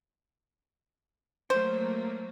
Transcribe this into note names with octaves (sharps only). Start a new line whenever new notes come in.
F#3 A3 A#3 C5